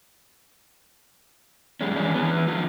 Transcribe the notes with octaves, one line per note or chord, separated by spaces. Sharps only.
F#2 G3 G#3 C#4
D#3 E3 C#4 D4 G#4
E3 B3
D3 F3 F4